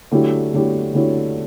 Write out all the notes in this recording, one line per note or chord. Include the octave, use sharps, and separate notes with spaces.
D3 F#3 A3 E4 G4
D3 F#3 A3 E4 G4
D3 F#3 A3 E4 G4